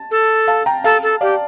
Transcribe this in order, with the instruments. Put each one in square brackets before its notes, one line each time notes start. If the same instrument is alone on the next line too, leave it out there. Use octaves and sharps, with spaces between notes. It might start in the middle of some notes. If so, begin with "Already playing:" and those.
Already playing: [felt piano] A5
[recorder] A4
[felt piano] F5 A5
G5 A#5
[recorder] A4 [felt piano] F5 A5
[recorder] A4
[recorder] G4 [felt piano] D5 F5